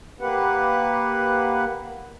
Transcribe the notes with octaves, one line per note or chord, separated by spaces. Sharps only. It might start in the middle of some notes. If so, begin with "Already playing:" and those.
A#3 G4 B4 F#5